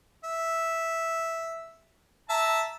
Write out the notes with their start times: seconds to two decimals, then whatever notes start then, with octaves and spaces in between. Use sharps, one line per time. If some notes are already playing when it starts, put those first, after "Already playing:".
0.24 E5
2.29 E5 A5 A#5